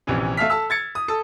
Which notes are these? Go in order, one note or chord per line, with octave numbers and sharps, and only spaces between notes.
A#1 C3 E3 C#4
A3 E5 F5 A5 F6 B6
A4 A5 E6
G#6 A6 C#7
D#6
A4 D#6